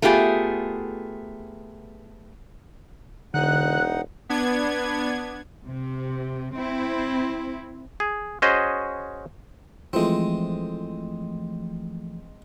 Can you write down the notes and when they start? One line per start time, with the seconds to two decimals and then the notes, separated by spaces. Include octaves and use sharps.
0.02 A3 B3 F4 G4 G#4
3.34 E1 D3 D#4 F#5 F#6
4.29 B3 D4 G#6
5.66 C3
6.56 C4 E4
8.00 G#4
8.42 C#4 F#4 G#4 C5 D#5
9.93 E3 F3 G#3 A3 C4